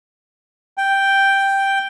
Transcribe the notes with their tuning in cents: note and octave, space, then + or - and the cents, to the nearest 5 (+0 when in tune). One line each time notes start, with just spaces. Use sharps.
G5 +0